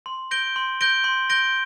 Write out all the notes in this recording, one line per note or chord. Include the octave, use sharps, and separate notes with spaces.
C6
G6 A#6 D7 G7
C6
G6 A#6 D7 G7
C6
G6 A#6 D7 G7